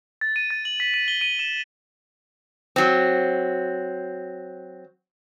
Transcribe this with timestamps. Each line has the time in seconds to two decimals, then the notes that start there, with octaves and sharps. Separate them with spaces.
0.21 A6
0.36 D#7
0.51 A6
0.65 F#7
0.80 B6
0.94 D#7
1.08 G7
1.21 D#7
1.39 E7
2.76 F#3 C4